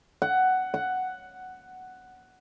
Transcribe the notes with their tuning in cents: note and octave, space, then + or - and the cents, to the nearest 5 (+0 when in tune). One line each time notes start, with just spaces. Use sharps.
F#5 +10
F#5 +5